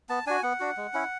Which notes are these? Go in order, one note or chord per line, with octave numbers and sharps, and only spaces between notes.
B3 A5
D4 F#4 G#5
B3 F#5
D4 F#4
G#3
C#4 E4